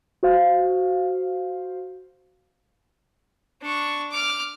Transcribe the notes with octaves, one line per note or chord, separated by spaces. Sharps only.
F#4 C5 F5
D4 C#6
D6 F6